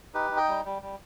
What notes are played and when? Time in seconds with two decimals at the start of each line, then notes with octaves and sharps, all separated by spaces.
0.14 D#4 G4 B4
0.31 D#4
0.37 D#5 G5
0.48 G3
0.65 G3
0.82 G3